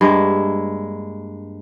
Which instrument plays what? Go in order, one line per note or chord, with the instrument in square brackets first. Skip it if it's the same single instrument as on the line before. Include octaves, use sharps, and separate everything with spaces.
[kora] G2 G#3 A#3 E5